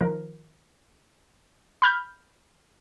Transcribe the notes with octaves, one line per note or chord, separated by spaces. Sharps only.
D#3 F3 A#4
B5 F6 G6